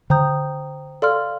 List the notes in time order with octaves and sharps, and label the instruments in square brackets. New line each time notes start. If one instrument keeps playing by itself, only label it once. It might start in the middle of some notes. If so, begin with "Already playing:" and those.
[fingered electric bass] D3 [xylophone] C5 G5 A#5 D#6 G6
[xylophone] A4 D5 F5 C6 F6